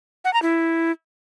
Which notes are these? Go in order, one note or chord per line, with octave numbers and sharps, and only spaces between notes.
F#5
A#5
E4